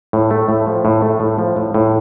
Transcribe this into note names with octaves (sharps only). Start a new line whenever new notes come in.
A2
A3
A2
F3
A2
A3
A2
F3
A2
A2